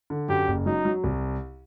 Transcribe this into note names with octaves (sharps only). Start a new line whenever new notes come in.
D3
F#2 G4
F#1
F#3 D#4
F#3
C2